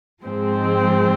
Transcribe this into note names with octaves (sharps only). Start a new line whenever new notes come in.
G#2 F3 G#3 C4